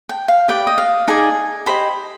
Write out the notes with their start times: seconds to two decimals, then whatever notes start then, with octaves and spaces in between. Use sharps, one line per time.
0.09 G5
0.28 F5
0.48 G4 B4 D5 G5
0.67 D#5
0.78 F5
1.08 D#4 G#4 D5 G#5
1.66 G4 C5 D#5 B5